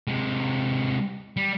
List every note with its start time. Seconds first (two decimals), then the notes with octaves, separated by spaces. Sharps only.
0.08 C3 G#3
1.37 G3